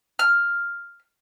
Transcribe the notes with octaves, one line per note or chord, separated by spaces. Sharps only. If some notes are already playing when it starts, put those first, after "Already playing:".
F6